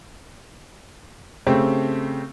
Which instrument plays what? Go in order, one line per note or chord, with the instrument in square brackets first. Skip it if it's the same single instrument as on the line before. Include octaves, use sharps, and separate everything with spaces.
[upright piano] C#3 A3 C4 G4